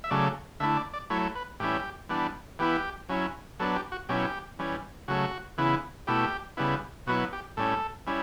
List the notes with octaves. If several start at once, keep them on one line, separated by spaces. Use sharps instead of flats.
E5
C#3 F#3 A3 D5
D3 A3 E4 E5
D5
D5
F#3 A3 E4 C#5
B4
A2 E3 G3 C#4 E4 G4
E3 G3 B3 D4
E3 B3 E4 G4
F#3 C#4 E4
F#3 B3 D4 A4
G4
F#4
B2 F#3 C#4 E4 G4
E3 G3 C#4
C#3 F#3 A3 F#4
C#3 E3 B3 E4
B2 A3 E4 G4
C#3 G3 B3 E4
B2 F#3 B3 E4 F#4
G4
A2 G3 C#4 A4
G3 C#4 E4